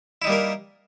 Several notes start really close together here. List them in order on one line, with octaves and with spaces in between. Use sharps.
E4 D#4 G3 A#3 A#4